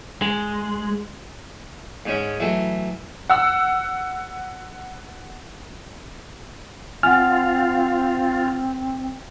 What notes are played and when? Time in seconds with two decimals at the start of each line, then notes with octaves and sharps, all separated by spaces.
0.22 G#3
2.06 G#2 G#3 C#4
2.40 E3 F#3 A3 F#4
3.30 F#5 E6
7.03 C4 F4 F#5 G#5 F6